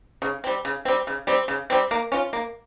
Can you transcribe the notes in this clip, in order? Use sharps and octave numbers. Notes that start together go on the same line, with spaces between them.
C#3
G3 C4
C#3
G3 C4
C#3
G3 C4
C#3
G3 C4
A#3
C#4 F4
A#3